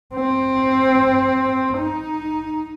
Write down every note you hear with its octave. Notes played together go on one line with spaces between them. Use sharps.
C4
D#4